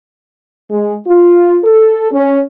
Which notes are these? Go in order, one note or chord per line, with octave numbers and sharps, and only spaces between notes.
G#3
F4
A4
C#4